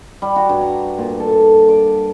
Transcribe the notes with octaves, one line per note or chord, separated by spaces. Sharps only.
G3
F#4
G2
A#5
A#2
A4
D6